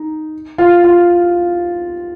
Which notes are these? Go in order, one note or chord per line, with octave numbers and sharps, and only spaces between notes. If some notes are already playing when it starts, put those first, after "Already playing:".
Already playing: D#4
F4
F4